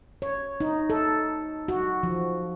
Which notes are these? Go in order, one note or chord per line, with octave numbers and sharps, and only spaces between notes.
C#5
D#4
A4
F#4
F3